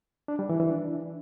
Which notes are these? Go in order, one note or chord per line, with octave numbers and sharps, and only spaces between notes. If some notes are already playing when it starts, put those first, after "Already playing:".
D4
G3
E3
E3
D4